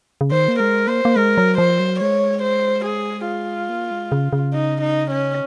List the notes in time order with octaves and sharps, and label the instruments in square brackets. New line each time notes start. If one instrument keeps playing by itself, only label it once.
[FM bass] C#3
[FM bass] D#3 [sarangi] C5
[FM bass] A#3
[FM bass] G#3 [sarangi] A#4
[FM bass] A#3 [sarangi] C5
[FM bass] A#3
[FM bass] G#3 [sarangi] A#4
[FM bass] F#3
[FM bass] F3 [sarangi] C5
[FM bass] F#3
[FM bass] G#3 [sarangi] C#5
[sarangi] C5
G#4
F4
[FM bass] A#3
G#3
C#3
C#3
[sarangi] D#4
D#4
C#4